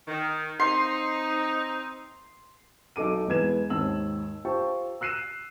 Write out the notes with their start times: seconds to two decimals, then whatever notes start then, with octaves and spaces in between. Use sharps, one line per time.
0.08 D#3
0.60 C4 D#4 C6
2.96 B1 D#4 A4 D6 D#7
3.27 E2 G#3 B3 G#6 E7
3.70 D#2 G#2 D#3 A5 E6 F#7
4.45 F4 G4 C5 G5 A5 C#6
5.01 E6 F#6 C7 D#7 E7